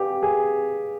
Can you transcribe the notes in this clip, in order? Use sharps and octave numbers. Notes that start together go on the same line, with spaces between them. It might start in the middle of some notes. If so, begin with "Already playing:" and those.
Already playing: G4 B4 D5 F5 G#5
G#4